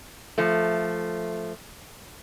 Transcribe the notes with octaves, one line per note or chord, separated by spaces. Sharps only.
F3 A3